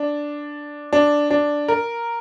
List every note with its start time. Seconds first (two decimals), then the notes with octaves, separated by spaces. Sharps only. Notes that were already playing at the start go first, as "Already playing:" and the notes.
Already playing: D4
0.93 D4
1.30 D4
1.68 A#4